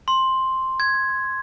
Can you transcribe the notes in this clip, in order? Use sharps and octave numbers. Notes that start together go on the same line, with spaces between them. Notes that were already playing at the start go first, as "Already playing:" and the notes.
C6
G#6